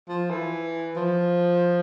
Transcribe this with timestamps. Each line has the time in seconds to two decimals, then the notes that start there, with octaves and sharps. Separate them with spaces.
0.09 F3
0.30 E3
0.96 F3